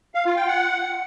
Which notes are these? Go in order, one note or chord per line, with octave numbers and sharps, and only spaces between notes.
F5
F4
G5
F#5